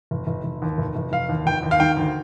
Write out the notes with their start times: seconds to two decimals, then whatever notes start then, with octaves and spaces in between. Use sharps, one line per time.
0.11 F1
0.27 F1
0.44 F1
0.62 D#2
0.78 F1
0.96 F1
1.12 F1 F5
1.29 D#2
1.46 F1 G5
1.63 D#2
1.71 F5
1.80 D#3 G5
1.97 D2